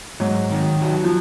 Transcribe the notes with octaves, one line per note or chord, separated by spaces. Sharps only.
G#2 F#3
D#3
F#3
F3